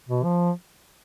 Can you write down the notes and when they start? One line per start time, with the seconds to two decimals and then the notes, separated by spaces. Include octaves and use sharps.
0.09 B2
0.24 F3